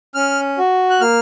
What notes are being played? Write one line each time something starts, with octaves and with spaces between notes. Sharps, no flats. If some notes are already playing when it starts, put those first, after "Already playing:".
C#4 F6
F#4
F#6
A#3 F6